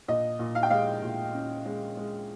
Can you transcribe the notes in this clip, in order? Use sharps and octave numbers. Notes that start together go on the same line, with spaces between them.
A#2 D#5
A#2
F5
G5
G#3 F5
A#2
C#4
G#3
G#3